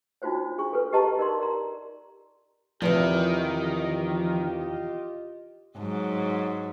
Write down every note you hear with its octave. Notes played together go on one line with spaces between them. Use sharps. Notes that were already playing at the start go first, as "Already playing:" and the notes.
D4 D#4 F4 F#4 C5 C#5
D4 G#4 C#6
A4 B4 C#5
G4 B4 D#5 A5 A#5 C#6
D#4 A#4 D5 C6
D5 A#5
E2 C3 D#3 F3 F4 G4 D#5
G#2 F#3